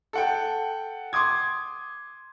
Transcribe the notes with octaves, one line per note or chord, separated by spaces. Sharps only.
A4 F#5 G5
C6 D6 D#6 G#6